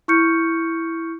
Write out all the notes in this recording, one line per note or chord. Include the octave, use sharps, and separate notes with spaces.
E4 C#6 F6 G6 C#7